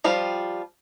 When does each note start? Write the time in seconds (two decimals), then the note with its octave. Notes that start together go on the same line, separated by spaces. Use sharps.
0.04 F3 G3 F4